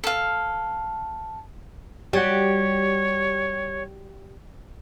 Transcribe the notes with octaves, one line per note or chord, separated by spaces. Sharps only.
A4 F5
G3 F#4 G4 C#5